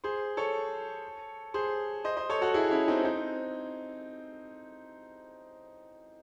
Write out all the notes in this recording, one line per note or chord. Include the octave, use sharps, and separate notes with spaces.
G#4 C5
A4 C#5
G#4 C5
C5 D#5
C5 D#5
A4 C#5
F#4 A4
E4 G#4
C#4 E4
C4 D#4
C4 D#4